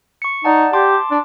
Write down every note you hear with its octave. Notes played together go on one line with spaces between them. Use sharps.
C#6 C#7
D#4 D5 F#5 A5
G4 A5 C6 D6
D4